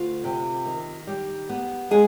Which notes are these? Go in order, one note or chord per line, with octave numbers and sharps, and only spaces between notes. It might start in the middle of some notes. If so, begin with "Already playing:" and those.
Already playing: D2 F4
C3
D#3
G3
B3
G#3 G#4